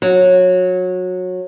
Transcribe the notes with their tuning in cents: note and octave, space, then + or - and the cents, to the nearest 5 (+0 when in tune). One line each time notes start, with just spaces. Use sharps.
F#3 -20